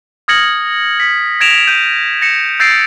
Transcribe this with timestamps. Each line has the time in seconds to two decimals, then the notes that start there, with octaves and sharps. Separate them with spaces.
0.28 D#6 F6 G#6 A#6 C#7 F#7
1.00 B6
1.40 G#6 A#6 D7 E7 F7
1.67 G6 D#7 F7
2.22 A#6 C#7 E7
2.60 E6 G6 A6 A#6 C7 D7